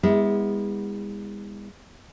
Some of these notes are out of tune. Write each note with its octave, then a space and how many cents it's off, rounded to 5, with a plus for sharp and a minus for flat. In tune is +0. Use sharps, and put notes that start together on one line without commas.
G#3 -40 B3 +0 E4 -35